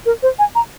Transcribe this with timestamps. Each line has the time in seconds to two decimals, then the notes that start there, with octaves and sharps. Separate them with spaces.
0.06 A#4
0.23 C5
0.39 G#5
0.55 A#5